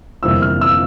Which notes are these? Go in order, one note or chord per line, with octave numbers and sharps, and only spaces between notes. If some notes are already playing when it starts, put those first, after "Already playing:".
G1 F2 C3 E3 A#3 E6
F6
E6